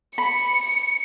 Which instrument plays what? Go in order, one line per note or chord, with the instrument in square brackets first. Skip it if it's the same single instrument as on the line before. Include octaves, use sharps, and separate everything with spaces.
[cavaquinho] B5 [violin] C#7